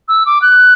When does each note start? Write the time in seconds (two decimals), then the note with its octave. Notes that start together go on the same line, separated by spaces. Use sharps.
0.08 E6
0.26 D6
0.42 F#6